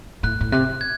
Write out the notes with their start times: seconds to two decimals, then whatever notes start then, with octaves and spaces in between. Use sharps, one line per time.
0.23 A2 F#6
0.41 A2
0.52 C3 F#6
0.81 G#6